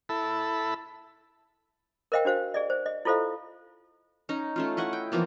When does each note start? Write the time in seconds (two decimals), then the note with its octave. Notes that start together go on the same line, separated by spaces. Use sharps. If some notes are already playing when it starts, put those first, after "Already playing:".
0.09 E4 A4 B5
2.12 A#4 C5 D#5 F5 G5
2.25 D4 F#4 C5 F5
2.54 G#4 D5 D#5
2.70 C5
2.86 D#5
3.05 E4 F4 A4 C5 D#5 F5
4.29 C#4 D#4
4.56 A3 C#4 F4
4.77 E4 D#5 F#5 C#6
4.93 G5
5.12 E3 F3 A#3 B3